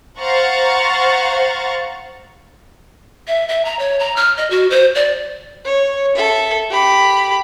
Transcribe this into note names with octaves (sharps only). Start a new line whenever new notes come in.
C5 F5 F#5 A#5 C#6 A6
E5
E5
A#5
C#5
A#5
F6
D#5
F#4
C5
D5
C#5
A4 E5
G4 B5